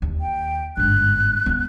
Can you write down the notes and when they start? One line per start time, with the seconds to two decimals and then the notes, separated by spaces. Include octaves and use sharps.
0.02 D#2
0.21 G5
0.77 G1 G#2 F#6
1.46 B3 F4